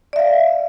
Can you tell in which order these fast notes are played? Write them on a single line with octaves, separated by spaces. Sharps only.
D5 E5 F5